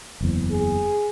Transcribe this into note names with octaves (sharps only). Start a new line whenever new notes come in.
F#1 E2
G#4